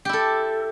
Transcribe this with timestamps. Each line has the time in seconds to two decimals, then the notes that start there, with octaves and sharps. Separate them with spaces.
0.05 G4
0.09 E4
0.13 A4